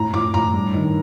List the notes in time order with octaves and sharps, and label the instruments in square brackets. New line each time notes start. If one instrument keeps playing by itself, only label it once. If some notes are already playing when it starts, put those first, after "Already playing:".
Already playing: [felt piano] A2 A#5
A2 D6
A2 A#5
G2
D#3